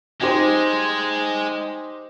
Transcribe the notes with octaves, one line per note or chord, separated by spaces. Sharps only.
G#3 D#4 G4 C5